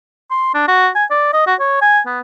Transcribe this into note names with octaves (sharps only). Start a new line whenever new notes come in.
C6
D4
F#4
G#5
D5
D#5
F#4
C#5
G#5
B3